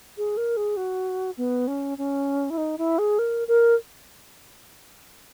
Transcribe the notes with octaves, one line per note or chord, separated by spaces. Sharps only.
G#4
A#4
G#4
F#4
B3
C#4
C#4
E4
D#4
E4
G#4
A#4
A#4